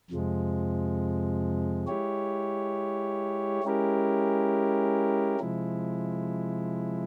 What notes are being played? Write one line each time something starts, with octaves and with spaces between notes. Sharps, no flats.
F2 C3 F3 G#3
G#3 E4 G4 C#5
G#3 C#4 E4 G4 A#4
C3 F3 G#3 E4